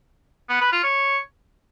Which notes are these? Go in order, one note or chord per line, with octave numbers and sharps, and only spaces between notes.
B3
B4
F4
C#5